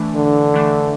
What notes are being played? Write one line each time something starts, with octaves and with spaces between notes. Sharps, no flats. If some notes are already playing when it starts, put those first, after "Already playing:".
Already playing: E3 A3 D4
D3
E3 A3 D4